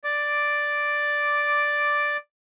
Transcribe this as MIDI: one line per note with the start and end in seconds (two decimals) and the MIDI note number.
0.04 2.17 74
0.04 2.17 86